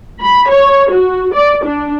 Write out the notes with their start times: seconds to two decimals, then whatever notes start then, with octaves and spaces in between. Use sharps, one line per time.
0.21 B5
0.50 C#5
0.92 F#4
1.34 D5
1.65 D4